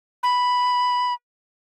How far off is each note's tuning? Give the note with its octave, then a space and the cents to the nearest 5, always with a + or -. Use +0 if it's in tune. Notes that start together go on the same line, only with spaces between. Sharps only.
B5 +0